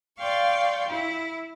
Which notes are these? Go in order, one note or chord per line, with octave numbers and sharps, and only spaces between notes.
D5 F5 G5 C6 C#6
E4